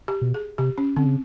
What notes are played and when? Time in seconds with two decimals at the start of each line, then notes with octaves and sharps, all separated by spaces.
0.08 G4
0.22 B2
0.34 G#4
0.58 C3 G4
0.78 C#4
0.96 D3 C4
1.06 C#3